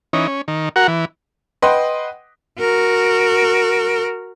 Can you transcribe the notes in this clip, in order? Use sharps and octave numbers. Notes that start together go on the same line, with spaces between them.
E3 C#4 D#4
C#4
D#3
F#4 A#4 F#5
E3
B4 D#5 F#5 G5 C6
F#4 A#4